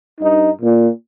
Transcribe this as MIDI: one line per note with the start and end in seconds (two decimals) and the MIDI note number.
0.20 0.50 43
0.20 0.50 63
0.62 0.88 46